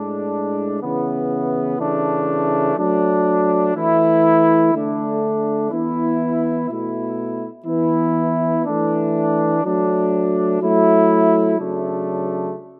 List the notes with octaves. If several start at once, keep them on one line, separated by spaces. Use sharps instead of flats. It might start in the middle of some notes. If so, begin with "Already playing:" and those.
Already playing: A2 G#3 D4
C#3 E3 B3 E4
C#3 E3 A3 D4
F#3 A3 D4
E3 A3 E4
D3 A3 D4
E3 B3 E4
B2 A3 E4
E3 B3 E4
E3 A3 D4
F#3 A3 D4
F#3 A3 E4
C#3 F#3 A3 D4